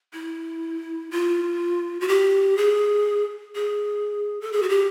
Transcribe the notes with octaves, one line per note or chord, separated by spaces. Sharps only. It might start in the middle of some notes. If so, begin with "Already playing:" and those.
E4
F4
F#4
G4
G#4
G#4
A4
G#4
F#4
G4